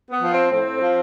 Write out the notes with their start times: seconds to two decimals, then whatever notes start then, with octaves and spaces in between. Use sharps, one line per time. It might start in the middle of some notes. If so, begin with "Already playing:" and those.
0.10 B3
0.21 F3
0.32 C4
0.51 A2 C4
0.81 F3